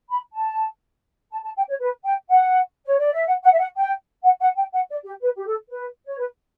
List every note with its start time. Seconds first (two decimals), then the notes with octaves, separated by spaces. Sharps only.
0.10 B5
0.35 A5
1.32 A5
1.44 A5
1.56 G5
1.69 C#5
1.80 B4
2.04 G5
2.29 F#5
2.85 C#5
2.99 D5
3.13 E5
3.27 F#5
3.43 F#5
3.52 E5
3.59 F#5
3.76 G5
4.23 F#5
4.41 F#5
4.56 G5
4.73 F#5
4.89 D5
5.04 G4
5.21 B4
5.35 G4
5.46 A4
5.70 B4
6.06 C#5
6.18 B4